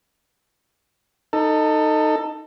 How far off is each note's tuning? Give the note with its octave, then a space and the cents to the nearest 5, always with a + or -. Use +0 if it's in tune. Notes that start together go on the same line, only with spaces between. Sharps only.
D#4 -5 A4 +15